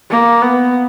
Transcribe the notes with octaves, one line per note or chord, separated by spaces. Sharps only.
A#3
B3